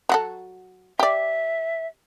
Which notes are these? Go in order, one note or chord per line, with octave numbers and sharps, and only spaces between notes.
F#3 F#4 A4
G4 D5 E5